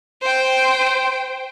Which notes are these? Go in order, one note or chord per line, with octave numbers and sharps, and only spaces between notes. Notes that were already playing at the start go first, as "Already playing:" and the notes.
C5 G5